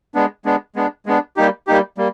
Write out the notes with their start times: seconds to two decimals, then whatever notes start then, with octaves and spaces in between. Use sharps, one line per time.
0.15 G#3 B3 D4
0.45 G#3 B3 D4
0.76 G#3 B3 D4
1.06 G#3 B3 D4
1.37 G3 A#3 D#4 G4
1.67 G3 A#3 D#4 G4
1.98 G3 A#3